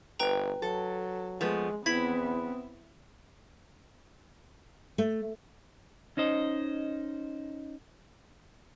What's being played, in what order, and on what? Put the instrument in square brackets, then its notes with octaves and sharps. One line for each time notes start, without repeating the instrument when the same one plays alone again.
[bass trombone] G1 [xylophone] B4 G5 A#5
[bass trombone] F#3 [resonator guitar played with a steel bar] A4
[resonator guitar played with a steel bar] F3 A3 B3 [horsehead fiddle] G#3
[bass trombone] E2 [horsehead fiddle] B3 C4 [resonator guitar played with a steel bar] E4 [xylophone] G#6 B6 F#7
[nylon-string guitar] A3
[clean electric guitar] C#4 D#4 C5 D#5